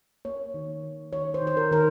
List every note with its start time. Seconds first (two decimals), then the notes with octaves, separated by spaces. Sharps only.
0.25 A#3 C#5
0.54 D#3
0.84 A#3
1.13 D#3 C#5
1.34 C5
1.42 D#3
1.47 C5
1.57 A#4
1.71 D#3 A#4